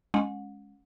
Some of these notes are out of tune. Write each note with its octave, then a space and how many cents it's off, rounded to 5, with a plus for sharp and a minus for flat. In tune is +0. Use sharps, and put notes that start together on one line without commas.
G#3 +0 C#4 +0 F#5 -30